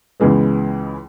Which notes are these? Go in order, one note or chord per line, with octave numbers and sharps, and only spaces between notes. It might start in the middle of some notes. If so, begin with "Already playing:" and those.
C#2 C#3 E3 G#3 B3